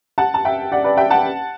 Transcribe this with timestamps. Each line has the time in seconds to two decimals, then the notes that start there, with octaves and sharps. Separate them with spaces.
0.18 F#5 A5
0.34 A5
0.45 E5 G5
0.72 D5 F#5
0.84 B4 D5
0.97 E5 G5
1.10 F#5 A5